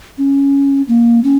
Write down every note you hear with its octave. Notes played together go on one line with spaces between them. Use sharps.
C#4
A#3
C#4